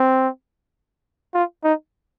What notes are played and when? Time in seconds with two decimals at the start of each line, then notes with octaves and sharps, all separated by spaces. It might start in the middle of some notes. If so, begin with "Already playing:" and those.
Already playing: C4
1.34 F4
1.64 D#4